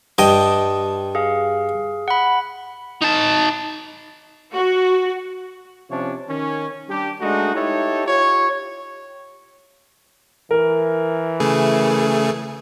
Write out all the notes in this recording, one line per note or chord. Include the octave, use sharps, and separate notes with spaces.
G2 D#5 G5 A5 D#6
G#4 F5
F#5 B5
D#4 A5
F#4
C3 F3 C#4 D4 C#5
D#3 C#4
G3 D4 G4
G#3 A3 D4 D#4 F#4
D#4 E4 G4 A4 C#5
F4 G4 C#5
E3 A#4
C#3 A3 G#4